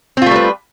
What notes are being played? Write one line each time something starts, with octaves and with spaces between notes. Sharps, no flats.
G3 A3 C4 F4 B4